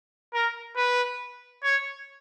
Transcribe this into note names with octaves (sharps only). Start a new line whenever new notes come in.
A#4
B4
C#5